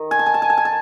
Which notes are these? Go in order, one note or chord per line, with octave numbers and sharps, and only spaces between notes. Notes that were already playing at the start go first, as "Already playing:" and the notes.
Already playing: D#3
G#5
A5
G#5
A5
G#5
A5
G#5
A5